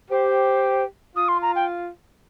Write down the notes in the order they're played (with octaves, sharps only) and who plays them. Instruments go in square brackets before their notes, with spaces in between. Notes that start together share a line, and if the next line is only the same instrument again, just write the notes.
[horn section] G4 [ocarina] C5
[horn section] F4 [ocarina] D#6
[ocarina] C6
A#5
G5